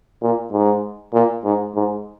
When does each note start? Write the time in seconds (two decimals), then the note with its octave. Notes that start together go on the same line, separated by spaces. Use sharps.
0.22 A#2
0.52 G#2
1.13 A#2
1.45 G#2
1.75 G#2